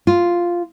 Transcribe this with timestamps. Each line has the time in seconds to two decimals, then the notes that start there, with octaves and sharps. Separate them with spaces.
0.07 F4